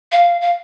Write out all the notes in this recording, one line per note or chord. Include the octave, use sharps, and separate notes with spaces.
F5
F5